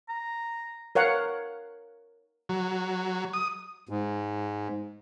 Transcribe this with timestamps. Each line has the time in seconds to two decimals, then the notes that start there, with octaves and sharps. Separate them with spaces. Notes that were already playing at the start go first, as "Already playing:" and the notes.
0.09 A#5
0.95 A#4 C#5 F5 F#5
2.49 F#3
3.34 D#6
3.89 G#2